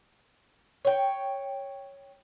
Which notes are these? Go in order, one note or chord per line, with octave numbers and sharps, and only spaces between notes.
C#5 G5